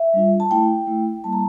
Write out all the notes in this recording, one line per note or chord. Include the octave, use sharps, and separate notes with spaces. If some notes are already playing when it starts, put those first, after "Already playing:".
Already playing: E5
G3 D4 F4
A5
A3 E4 G5
A3 E4
G3 A#3 E4 A5
A#5